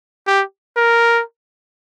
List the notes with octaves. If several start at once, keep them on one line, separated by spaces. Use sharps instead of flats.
G4
A#4